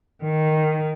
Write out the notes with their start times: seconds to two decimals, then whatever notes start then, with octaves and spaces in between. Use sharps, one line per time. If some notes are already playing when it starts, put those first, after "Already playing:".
0.24 D#3